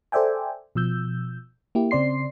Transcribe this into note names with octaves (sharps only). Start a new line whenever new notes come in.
A4 C5 D5 E5 G5 G#5
B2 F3 E6 G6
A#3 E4 G4
C#3 C4 D5 C6 C7